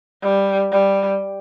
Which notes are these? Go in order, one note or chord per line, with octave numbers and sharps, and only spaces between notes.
G3
G3